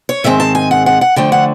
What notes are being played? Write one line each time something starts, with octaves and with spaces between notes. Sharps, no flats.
C#5
G#2 D#3 G#3 C4 E5
A5
G#5
F#5
F#5
F#5
D3 F3 A3 G5
F#5